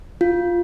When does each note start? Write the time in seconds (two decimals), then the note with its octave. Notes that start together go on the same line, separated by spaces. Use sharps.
0.21 F4